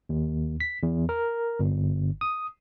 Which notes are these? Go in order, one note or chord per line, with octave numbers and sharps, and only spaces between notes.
D#2
B6
E2
A#4
G1
D#6